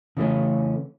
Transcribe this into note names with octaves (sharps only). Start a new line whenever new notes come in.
C#3 E3 A3 C#4